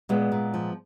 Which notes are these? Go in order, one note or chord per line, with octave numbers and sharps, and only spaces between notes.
A#2 G#3 B3
A#2
F3